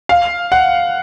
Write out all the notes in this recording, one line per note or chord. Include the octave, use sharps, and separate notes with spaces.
F5
F#5